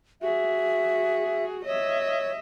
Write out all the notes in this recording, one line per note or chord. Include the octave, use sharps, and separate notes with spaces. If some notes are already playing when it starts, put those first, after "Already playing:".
F#4 G#4 E5
C#5 D#5 E5